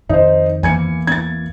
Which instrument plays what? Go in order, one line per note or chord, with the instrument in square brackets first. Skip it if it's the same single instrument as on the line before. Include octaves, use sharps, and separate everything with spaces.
[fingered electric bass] F2 D#3 [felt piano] D#4 C5
[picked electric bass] E2 E3 A#3 [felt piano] G#5 G#6 C#7
[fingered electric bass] B3 [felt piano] G#6 A6